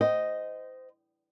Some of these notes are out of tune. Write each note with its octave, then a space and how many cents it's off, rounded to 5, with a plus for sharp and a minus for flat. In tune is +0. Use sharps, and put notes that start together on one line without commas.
C5 -20 D#5 +0 G5 -30